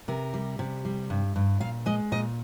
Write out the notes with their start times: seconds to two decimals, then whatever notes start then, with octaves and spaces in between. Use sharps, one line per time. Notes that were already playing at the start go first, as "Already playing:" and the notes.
0.08 C3 A#4
0.34 G3
0.59 C3
0.85 G3
1.10 G2
1.36 G2
1.60 A#2 F5
1.86 G#3 D#5
2.12 A#2 D#5